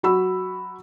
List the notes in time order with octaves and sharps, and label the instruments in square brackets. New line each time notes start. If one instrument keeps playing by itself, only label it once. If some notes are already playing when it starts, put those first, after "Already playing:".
[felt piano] F#3 F#4 B5 E6